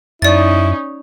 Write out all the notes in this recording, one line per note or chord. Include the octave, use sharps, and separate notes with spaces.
F#2 C#4 D#4 E4 D5 A6